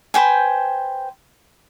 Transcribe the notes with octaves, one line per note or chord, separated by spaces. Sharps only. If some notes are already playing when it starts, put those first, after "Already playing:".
B4 C5 G5 G#5